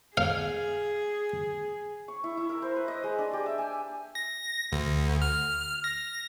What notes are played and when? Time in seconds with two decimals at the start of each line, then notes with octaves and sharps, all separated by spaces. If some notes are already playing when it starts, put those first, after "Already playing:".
0.17 G#4 F5
2.08 C#6
2.24 E4
2.37 E4
2.49 A#4
2.62 C5
2.76 B4
2.88 D#5
3.04 G#3
3.18 D4
3.33 G4
3.46 E5
3.58 G#5
4.15 A#6
4.72 D2
5.22 F6
5.84 A#6